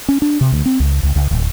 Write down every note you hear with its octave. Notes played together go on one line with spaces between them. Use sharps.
C#4
D4
C3
D2
C4
C#2
C#2
C#2
D1